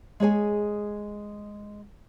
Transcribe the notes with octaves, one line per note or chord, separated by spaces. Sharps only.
G#3 G#4 C#5 G#5